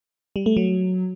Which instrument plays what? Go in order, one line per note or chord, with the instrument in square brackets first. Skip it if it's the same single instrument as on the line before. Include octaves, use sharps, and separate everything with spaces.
[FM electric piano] G3
A3
F#3